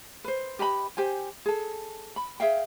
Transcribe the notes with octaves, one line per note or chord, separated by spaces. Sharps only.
B4 C5
G4 B4 D#5 B5
G4 C5 G#5
G#4 A4
B5
G#4 E5 F5 G5